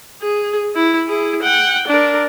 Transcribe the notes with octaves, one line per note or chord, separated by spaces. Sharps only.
G#4
E4
E4 G#4
F#5 G5
D4 A#4